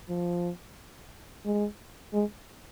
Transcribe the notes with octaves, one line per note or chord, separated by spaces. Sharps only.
F3
G#3
G#3